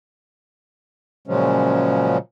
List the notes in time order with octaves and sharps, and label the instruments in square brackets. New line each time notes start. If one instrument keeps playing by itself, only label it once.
[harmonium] A#2 C#3 F3 F#3 G#3 C#4